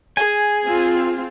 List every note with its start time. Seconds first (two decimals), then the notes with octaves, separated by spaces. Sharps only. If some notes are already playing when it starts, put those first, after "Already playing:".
0.17 G#4 G#5
0.64 C4 F4